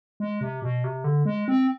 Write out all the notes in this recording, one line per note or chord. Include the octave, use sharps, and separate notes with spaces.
G#3
C3
B2
C3
D3
G#3
C4